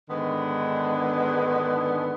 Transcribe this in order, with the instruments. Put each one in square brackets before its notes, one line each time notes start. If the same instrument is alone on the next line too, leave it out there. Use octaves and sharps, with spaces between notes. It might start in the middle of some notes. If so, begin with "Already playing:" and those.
[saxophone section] G#2 D3 D#3 G#3 B3 D4